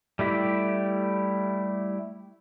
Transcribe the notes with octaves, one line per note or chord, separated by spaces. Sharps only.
G3 A3 E4 G4